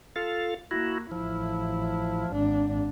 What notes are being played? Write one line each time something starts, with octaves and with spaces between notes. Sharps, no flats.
F4 A4 F5
A#3 E4 F#4
A1 F3 E4
G#1 D4